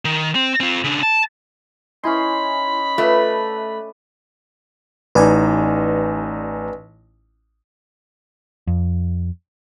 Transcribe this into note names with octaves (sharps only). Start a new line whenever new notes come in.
D#3
C4
C4 F4
C#3 D4
A5
C#4 D#4 E4 G#5 B5 C6
A3 F4 B4 D5 E5
A1 D#4 B4 D5 G#5
F2